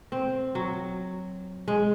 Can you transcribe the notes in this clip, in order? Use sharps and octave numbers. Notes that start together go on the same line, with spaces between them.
C4
F#3
G#3